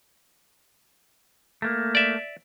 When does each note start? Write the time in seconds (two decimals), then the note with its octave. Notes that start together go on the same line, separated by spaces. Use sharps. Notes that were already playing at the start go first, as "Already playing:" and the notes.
1.62 A3 A#3
1.95 D5 E5